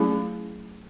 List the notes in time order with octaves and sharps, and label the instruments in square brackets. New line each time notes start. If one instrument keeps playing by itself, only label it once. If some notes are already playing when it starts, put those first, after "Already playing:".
Already playing: [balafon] F#3 A3 C#4 E4 G#4